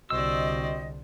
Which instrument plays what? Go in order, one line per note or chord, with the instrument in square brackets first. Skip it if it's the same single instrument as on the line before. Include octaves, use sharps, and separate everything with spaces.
[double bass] C2 D3 [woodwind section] C4 F#4 D#5 [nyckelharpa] C5 D5 [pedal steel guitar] E6